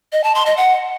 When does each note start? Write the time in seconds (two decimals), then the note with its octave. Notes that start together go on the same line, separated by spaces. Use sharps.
0.13 D#5
0.24 A5
0.35 C6
0.46 D#5
0.57 F#5